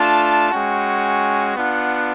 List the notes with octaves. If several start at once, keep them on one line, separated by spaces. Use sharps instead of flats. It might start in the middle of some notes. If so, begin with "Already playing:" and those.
Already playing: A3 D4 F4 A5
G#3 C#4 F#4 G5
B3 D4 F4 F#5